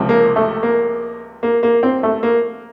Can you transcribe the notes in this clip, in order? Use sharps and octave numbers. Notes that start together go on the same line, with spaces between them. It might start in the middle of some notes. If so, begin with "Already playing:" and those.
Already playing: C#2 C3 F3
A#3
A3
A#3
A#3
A#3
C4
A3
A#3